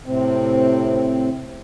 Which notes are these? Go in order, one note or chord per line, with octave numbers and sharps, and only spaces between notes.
A2 C3 C4